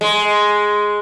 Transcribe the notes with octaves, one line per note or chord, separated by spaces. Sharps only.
G#3